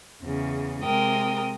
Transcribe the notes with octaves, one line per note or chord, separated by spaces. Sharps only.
E2 C#3
C3 G#3 A#4 G5 D#6